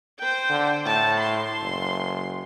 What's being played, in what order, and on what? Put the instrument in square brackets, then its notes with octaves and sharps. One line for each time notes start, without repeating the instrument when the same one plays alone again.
[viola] C5 G5
[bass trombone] D3
[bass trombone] A2 [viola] A5
[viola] C6
[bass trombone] F#1